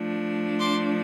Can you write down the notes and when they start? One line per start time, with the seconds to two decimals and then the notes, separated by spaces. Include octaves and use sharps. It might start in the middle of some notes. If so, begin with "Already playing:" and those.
Already playing: F3 A3 D4
0.59 C6 D6